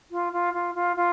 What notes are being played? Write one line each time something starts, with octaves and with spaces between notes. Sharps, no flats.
F4
F4
F4
F4
F4